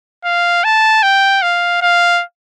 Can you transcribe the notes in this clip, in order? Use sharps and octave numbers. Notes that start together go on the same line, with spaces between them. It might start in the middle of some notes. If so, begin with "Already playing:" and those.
F5
A5
G5
F5
F5